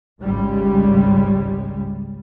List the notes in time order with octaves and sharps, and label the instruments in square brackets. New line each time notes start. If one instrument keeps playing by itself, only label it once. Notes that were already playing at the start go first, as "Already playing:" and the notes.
[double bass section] G#1 C#2 C#3 G3 G#3